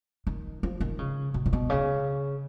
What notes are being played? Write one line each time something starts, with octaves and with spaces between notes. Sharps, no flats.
D#3
F3
D#3
C#3
B2
A#2
B2
C#3